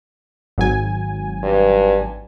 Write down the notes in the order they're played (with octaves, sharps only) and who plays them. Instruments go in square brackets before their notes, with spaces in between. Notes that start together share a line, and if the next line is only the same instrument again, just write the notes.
[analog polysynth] G#1 F#3 G#5
[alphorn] G2